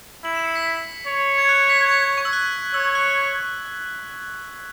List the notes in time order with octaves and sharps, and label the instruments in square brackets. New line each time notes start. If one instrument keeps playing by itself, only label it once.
[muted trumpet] E4 [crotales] F#7
[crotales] E7
C#7
B6
[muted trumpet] C#5
[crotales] G#6
F#6
B6
G#6
B6
C#6
E6
F#6
[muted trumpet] C#5 [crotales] E6
[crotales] E6
F#6